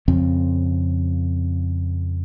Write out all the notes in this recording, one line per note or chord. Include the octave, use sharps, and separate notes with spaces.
F2 C#3 F3 C4